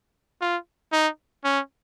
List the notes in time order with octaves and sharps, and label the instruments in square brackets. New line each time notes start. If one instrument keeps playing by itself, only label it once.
[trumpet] F4
D#4
C#4